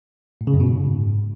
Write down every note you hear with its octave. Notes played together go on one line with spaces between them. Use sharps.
A2
C#3
F#2
B2
G#2